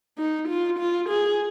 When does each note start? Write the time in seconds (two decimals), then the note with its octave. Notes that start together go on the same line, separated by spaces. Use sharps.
0.18 D#4
0.48 F4
0.79 F4
1.09 G#4